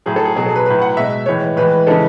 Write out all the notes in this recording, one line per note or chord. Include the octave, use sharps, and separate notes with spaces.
A2 F#3 G#4
A4
G#4
B2 F#3 G#4
A4
B4
A2 F#3 B4
F#5
B2 G#3 E5
A2 E3 G#3 C#5
A2 E3 G#3 B4
C#3 E3 G#3 A4